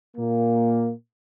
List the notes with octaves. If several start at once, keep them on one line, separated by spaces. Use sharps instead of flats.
A#2 A#3